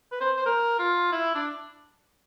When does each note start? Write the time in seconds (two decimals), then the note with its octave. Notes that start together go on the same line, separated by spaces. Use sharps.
0.12 B4
0.20 C5
0.37 C5
0.46 A#4
0.79 F4
1.12 E4
1.35 D4